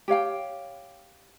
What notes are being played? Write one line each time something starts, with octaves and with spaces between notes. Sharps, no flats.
G4 C#5 F5 G5